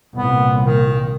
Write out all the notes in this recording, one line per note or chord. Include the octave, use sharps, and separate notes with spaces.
C2 A#2 B3
D#3